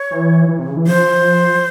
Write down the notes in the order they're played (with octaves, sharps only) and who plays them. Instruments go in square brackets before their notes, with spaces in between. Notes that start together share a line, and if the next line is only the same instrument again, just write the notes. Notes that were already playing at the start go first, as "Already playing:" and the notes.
Already playing: [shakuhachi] C#5
[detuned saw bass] E3
E3
C3
C#3
E3
[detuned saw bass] F3 [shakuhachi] C5